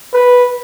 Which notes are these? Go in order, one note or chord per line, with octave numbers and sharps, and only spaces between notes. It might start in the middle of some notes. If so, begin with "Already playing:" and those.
B4